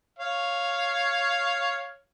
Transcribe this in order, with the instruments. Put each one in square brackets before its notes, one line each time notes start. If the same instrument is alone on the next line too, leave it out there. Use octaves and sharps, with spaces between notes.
[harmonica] C#5 F5